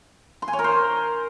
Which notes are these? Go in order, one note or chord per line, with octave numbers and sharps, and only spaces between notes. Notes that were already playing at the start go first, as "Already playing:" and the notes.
C6
G#5
C#5
A#4
C5